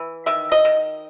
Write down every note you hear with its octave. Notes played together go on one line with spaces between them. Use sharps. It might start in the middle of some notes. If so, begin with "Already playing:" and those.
Already playing: E3
D#3 E5
D#5
D#3